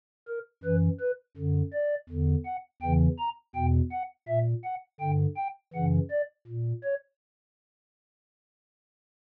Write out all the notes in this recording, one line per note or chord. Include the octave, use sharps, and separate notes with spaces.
A#4
F#2 E3 B4
B4
F#2 D3
D5
E2 D3
F#5
E2 C#3 E3 G5
A#5
E2 B2 G5
F#5
A#2 E5
F#5
G2 D3 G5
G5
F#2 C#3 E3 F#5
D5
A#2
C#5